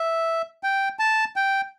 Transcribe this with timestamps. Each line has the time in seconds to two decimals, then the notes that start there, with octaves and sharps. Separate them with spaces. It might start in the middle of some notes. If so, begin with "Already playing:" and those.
Already playing: E5
0.63 G5
0.99 A5
1.36 G5